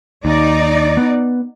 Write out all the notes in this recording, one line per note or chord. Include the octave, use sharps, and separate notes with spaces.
D#2 D#4 D5
B3